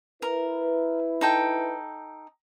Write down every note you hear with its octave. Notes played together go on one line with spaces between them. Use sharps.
E4 A#4 B4
D#4 A4 G5